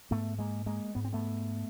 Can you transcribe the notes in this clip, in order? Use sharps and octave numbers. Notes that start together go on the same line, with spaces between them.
G#2 A3 B3
G#3 A#3
G#3 A#3
G#2 B3
C4
A3 B3